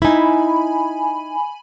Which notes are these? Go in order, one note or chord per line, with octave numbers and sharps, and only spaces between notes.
D#4 E4 G#5 B5